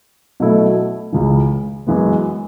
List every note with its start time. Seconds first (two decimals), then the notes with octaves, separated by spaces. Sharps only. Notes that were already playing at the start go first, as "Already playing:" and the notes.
0.40 B2 F#3 A3 E4
1.12 C#2 C#3 E3
1.86 F#2 E3 G#3 B3